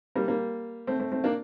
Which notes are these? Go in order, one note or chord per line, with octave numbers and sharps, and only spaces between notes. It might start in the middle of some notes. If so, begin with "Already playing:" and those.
G3 A#3
G3 A#3
A3 C4
A3 C4
A3 C4
A#3 D4